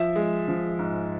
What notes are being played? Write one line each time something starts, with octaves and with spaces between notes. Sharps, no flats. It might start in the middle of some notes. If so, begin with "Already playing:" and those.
Already playing: F3 E5
G#3
F3
G#2